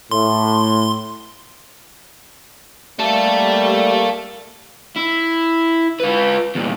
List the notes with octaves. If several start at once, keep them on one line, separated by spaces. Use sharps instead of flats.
A2 C6
G3 A3 A#3 A4
E4
F4 B4
E2 A#2